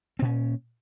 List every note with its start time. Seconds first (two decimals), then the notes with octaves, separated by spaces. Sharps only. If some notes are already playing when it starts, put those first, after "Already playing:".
0.19 C4
0.22 A#2
0.25 C#4